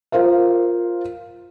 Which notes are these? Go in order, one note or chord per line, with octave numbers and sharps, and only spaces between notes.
F4 A#4 C5 F5